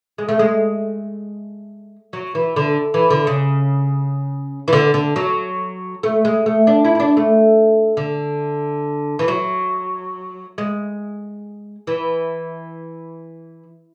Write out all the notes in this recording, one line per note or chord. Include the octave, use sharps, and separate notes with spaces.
G#3
A3
G#3
F#3
E3
D3
E3
D3
C#3
E3
D3
D3
F#3
A3
G#3
A3
D4
E4
E4
D4
A3
D3
E3
F#3
G#3
E3